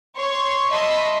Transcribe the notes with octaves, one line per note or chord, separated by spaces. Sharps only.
C#5 C6 C#6
D#5 E5 A5 B5 C6